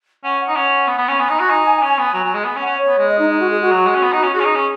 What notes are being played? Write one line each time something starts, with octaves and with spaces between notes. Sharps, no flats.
C#4 F#5
F#5
D#4
C#4 F#5
B3
B3
C#4
B3 G#5
D#4
F#4
D#4
C#4
B3
F#3
F#3
G#3
B3 G#5
C#4
F#5
C#4
C#5
B3
G#3
D#5
D#4
D#4
F#4
G#4
F#4
F#3
G#3
C#4
B3
D#4
C#4
F#4 G#4
C#4
D#4
C#4